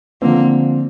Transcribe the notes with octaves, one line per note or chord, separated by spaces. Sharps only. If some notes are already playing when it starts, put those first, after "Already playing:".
D3 F3 A#3 C4